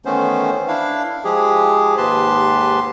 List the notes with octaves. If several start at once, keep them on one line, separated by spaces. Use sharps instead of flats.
D#3 E3 A3 B3 C#4 C5
D4 E4 F5
F3 G#3 G4 G#4
D#2 G#2 G4 B4 A5 C6